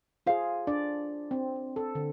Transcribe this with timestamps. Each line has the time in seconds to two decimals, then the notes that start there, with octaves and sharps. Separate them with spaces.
0.27 F4 G#4 C5 F5
0.67 D4 D5
1.31 C4
1.76 A4
1.95 D3